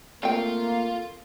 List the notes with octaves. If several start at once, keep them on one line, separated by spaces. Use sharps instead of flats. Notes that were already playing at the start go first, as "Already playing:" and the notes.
A3 A#3 C4 F4 G5